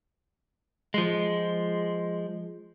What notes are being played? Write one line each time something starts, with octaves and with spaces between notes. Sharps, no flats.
F3 G#3